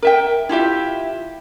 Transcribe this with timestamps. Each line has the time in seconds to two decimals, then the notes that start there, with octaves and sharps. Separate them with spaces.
0.02 A#4 E5 G5
0.49 E4 F4 G4 E5